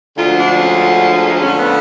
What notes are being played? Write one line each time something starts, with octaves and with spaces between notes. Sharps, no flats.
D2 D3 F3 G#3 F4
D4
C#4
F2 D3 F3 A3 C#4
B3